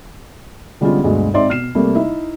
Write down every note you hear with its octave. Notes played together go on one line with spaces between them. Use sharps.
D3 G3 G#3 B3 C#4 F4
D2 G2 B2 G#3 A3 B3
G#1 C4 D#4 D5 E5 C6
B2 F6 C7 E7
C3 G3 A3 A#3
D#4 E4 E5